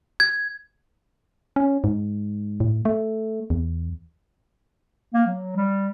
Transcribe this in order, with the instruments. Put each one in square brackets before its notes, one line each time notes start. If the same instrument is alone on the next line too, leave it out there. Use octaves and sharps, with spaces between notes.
[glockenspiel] G#6
[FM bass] C#4
G#2
A2
A3
E2
[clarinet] A#3
F#3
G3